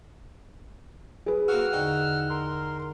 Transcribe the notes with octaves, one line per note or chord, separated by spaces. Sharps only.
G#4 B4
A#3 C4 F#4 F#5 E6 F6
E2 D3 D#4 G5
A#4 C6